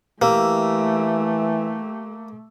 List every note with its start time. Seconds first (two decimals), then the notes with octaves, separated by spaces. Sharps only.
0.22 E3 A3 A#3 G4 E6